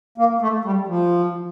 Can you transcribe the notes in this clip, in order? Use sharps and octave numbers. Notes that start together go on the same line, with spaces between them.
A#3
A3
G3
F3